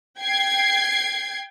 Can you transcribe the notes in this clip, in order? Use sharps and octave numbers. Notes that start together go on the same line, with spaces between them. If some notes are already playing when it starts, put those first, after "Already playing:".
G5 G#6 C7